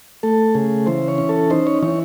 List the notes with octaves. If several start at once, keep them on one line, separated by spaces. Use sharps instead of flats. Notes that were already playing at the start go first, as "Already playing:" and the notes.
A3 A4
C#3 G#4
E3 C5
C#5
C#4
A4
D#4 C5
C#5
E3 C#5